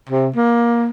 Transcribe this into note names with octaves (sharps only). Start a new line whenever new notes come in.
C3
A#3